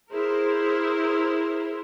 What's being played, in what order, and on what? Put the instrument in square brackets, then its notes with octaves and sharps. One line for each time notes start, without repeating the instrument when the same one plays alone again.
[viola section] E4 A#4 C5 [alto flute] G#4